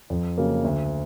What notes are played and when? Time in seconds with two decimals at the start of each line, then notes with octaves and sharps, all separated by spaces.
0.10 F2
0.38 C#3 F#3 A#3
0.64 D2